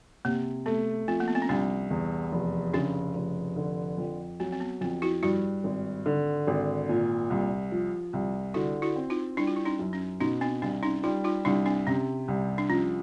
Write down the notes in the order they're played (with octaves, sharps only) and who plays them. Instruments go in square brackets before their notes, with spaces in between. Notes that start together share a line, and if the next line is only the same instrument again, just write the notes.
[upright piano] C3 [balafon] A#3
[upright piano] A3 [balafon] B3
[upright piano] F3 [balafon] C4
[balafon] A#3
B3
C4
C#4
[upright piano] C2 [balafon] C4 D4
[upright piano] E2
F1
[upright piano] C#3 [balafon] C4 D4
[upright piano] F1
D3
F2
[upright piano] F#3 [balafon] C4
[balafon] C4
B3
[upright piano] F2 [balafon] C4
[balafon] E4 F#4
[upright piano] G2 [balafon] E4 F#4
[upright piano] G#1
D3
G#1
A#2
C2
F3
C2
[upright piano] D3 [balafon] E4 F#4
[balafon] E4 F#4
[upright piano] C4
[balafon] D#4 F4
[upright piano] G3 [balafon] D4 E4
[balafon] F4
E4
C#4 D#4
[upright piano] F#2
[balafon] C#4
[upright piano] B2 [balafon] C#4 D#4
[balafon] C4 D4
[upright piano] C2 [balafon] C4 D4
[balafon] C#4 D#4
[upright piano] G3 [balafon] D#4 F4
[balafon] D#4 F4
[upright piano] C2 [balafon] D4 E4
[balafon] C4 D4
[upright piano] C3 [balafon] C#4
[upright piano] C2
[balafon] D4
[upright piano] F3 [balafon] C#4